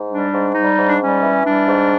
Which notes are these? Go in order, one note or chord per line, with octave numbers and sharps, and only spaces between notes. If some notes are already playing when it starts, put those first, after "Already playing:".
Already playing: G#2
G3 D4
G#2
G3 D#4
G#2
D4
G3 C#4
E3
G3 D4
G#2